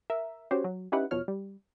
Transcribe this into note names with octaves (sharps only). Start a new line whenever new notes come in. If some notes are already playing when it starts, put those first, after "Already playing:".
A#4 E5
C#4 F#4 G4 C5 C#5
F#3
C#4 D#4 E4 G4 B4 F#5
E2 B2 F3 C#5 F6
G3